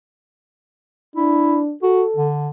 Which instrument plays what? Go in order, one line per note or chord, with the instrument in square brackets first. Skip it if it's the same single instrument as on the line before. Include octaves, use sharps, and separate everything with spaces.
[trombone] D4 [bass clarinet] E4
[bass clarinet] F#4 [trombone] A4
[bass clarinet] D3